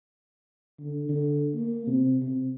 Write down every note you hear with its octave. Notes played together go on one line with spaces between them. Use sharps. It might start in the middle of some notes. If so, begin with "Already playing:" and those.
D3
D3
A#3
C3
C3